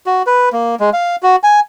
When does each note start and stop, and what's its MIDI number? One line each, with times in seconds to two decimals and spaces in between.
0.06 0.22 66
0.27 0.49 71
0.53 0.75 58
0.80 0.90 56
0.93 1.16 77
1.23 1.36 66
1.43 1.60 80